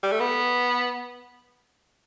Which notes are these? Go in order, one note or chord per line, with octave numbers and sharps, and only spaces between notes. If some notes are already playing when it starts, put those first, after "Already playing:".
G3
A3
B3